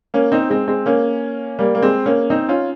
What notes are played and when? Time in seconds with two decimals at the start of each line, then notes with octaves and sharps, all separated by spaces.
0.14 A#3 C#4
0.32 C4 D#4
0.50 G#3 C4
0.68 G#3 C4
0.86 A#3 C#4
1.59 G3 A#3
1.75 A#3
1.82 G#3 C4
2.06 A#3 C#4
2.30 C4 D#4
2.49 C#4 F4